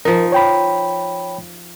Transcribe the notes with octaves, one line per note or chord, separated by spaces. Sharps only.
F3 D#4 A#4
C#5 G5 B5